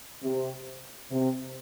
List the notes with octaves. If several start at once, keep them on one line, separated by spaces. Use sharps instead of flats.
C3
C3